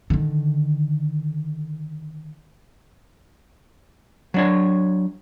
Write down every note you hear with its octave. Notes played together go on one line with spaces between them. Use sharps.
D3 D#3
F#3 D4 C#5